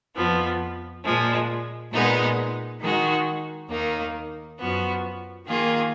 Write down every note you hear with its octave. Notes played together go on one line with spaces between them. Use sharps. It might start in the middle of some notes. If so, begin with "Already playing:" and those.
F2 F3 B3
A#2 F3 G#3
A#2 G#3 B3 D#4
D#3 G#3 D#4 F#4
D#2 D#3 A#3 D#4
F#2 F3 B3 F#4
D#3 A#3 F4 G#4